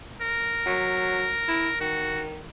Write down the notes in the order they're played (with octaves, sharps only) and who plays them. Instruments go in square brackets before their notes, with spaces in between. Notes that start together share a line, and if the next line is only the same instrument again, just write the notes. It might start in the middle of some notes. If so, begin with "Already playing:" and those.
[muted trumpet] A#4
[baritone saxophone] F#3
E4
[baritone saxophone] D#3 [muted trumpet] F#4